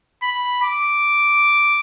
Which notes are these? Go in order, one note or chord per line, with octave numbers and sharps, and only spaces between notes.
B5
D6